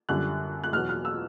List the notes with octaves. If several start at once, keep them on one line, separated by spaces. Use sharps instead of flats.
F#2 D3 G3 F#6
F#6
E2 B2 F#3 F6
F6
E6